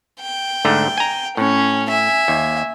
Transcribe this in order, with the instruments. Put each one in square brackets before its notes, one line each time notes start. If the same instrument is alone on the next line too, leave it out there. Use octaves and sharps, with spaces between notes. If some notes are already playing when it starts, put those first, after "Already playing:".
[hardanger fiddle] G5
[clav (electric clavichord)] G#2 D3 A3
G#5 A#5
[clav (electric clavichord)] A2 [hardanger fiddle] C#4
[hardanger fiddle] E5 G#5
[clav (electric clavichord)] D#2